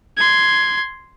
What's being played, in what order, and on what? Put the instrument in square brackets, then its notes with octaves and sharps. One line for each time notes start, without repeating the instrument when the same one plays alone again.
[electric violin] C6 G#6